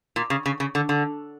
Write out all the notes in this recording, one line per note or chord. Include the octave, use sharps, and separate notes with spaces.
A#2
C#3
C#3
C#3
D3
D3